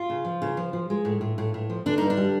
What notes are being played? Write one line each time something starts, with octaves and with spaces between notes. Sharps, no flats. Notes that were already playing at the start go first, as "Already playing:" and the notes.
Already playing: F4
C#3
F3
C#3
F3
F3
G#3
A2
A2
A2
A2
F3
D3 D4
G2 D#4
D4
G3